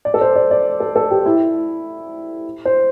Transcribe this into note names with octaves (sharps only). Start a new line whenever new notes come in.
D5
A4
C5
D5
D5
A4
A4
G4
E4
C5